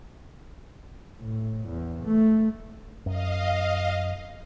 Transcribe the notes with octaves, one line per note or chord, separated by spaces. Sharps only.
A2
E2
A3
F#2 D#5 F5